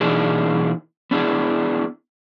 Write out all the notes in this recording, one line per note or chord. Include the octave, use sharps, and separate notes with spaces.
B2 E3 A#3 D4 D#4 G#4
B3 D4 E4 G#4